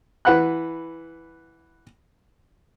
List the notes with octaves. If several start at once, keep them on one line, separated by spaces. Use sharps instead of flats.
E3 B4 F#5 B5 F#6